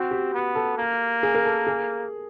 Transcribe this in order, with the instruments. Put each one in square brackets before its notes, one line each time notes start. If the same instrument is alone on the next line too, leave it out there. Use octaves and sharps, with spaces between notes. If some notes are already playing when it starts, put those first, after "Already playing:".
Already playing: [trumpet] C4 [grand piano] F#4
[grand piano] G4
[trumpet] B3
[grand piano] A4
[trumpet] A#3
[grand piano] G#4
A#4
A4
G#4